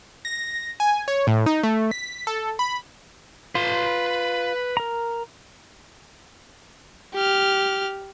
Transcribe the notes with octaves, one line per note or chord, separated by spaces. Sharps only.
A#6
G#5
C#5
A2
D#4
A3
B6
A4
B5
F4 B4 C6
A#4 A#5
G4 F6